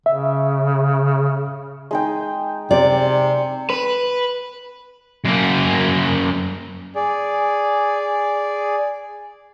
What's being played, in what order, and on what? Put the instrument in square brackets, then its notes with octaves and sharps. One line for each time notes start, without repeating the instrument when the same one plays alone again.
[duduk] C#3 [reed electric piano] E5
[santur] G#3 D#4 G5
[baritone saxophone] C3 [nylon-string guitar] D5
[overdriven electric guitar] B4
[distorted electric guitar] F#2 A#3
[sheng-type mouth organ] G#4 D5